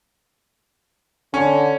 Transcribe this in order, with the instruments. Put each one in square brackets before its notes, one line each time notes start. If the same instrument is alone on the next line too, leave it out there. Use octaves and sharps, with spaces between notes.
[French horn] D3 [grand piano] C#4